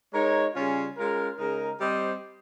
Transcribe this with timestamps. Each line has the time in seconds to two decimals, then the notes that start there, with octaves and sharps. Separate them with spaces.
0.14 G#3 D#4 A#4 C#5
0.55 C#3 G3 C#4 F4
0.97 G#3 C#4 F4 A#4
1.38 C#3 G#3 D#4 A#4
1.80 G3 C4 G4 C5 D#5